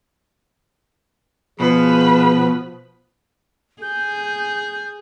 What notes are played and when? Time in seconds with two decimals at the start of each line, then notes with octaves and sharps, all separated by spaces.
1.60 B2 F3 G#4 B4
3.82 G#4 G6